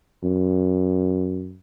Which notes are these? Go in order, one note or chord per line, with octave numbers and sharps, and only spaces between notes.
F#2